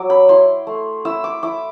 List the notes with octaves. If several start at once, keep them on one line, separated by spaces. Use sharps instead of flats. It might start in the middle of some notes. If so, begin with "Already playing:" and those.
Already playing: F#3 D6 E6
B5
E4 C6
A3
E4 E6
D6
E4 D6